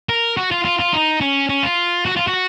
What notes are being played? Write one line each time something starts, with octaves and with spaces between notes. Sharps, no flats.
A#4
F#4
F4
F4
F4
D#4
C#4
C#4
F4
F#4
F4
F#4